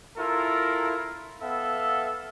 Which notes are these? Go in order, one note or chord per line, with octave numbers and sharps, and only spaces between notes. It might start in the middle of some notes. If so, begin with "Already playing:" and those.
E4 F4 A4 A#4
B3 A4 E5 F5